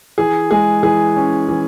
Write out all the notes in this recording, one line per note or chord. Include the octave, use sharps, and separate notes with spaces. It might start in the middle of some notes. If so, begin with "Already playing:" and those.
E3 G#4
G#3 G#4
E3 G#4
C#4
E3